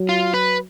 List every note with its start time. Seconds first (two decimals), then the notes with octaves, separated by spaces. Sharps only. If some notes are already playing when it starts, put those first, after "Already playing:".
Already playing: F#3
0.09 F4
0.34 B4